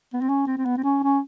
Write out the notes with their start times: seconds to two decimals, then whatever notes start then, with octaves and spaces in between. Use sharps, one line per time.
0.13 B3
0.21 C4
0.29 C#4
0.47 C4
0.58 C4
0.65 B3
0.77 C4
0.83 C#4
1.03 C#4